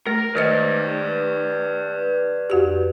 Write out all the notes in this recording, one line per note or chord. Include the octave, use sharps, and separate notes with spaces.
A3 A#4
D#3 B4 C5 D5 D#5
F2 F#4 G4